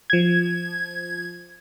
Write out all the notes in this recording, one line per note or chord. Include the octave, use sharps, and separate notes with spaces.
F3 G#6